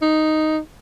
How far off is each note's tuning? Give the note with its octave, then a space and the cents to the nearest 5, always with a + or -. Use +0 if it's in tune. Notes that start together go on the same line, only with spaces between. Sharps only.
D#4 +0